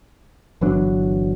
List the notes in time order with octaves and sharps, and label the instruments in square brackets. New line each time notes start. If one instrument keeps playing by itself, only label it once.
[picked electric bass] G1 E3 F#3 D4